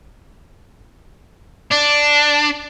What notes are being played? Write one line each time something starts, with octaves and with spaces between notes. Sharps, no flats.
D4